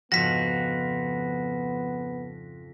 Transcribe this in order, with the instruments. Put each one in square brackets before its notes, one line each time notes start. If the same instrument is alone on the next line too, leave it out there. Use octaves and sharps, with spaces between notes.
[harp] F2 G#2 C#3 [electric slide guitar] F3 F#4 [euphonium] B3 [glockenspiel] A#6 B6